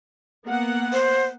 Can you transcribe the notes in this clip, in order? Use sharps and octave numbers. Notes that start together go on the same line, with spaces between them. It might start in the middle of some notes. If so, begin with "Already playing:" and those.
A#3 B3 F#5
C5